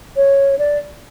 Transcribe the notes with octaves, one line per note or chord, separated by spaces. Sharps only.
C#5
D5